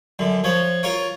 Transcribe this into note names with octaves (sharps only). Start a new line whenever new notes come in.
F#2 D3
F3 C#5
F4 A#4 C#5